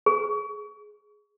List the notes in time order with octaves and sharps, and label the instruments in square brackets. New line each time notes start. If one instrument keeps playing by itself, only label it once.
[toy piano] G#4